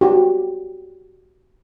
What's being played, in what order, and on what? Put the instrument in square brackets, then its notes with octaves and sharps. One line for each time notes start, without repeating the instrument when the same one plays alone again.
[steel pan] F#4 G4